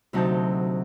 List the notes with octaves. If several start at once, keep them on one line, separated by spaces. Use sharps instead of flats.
D2 C3 F#3 D#4 A5 G6